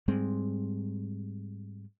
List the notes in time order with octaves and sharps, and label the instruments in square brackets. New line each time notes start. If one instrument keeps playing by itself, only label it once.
[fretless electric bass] G#2 G3 G#3 C4